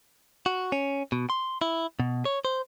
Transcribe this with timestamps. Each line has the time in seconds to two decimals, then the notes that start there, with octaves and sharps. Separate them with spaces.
0.46 F#4
0.72 C#4
1.12 B2
1.30 C6
1.62 E4
2.00 B2
2.25 C#5
2.45 C5